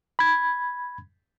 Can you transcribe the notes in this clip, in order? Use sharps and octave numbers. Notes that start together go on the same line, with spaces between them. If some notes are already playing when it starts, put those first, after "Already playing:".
B5 G#6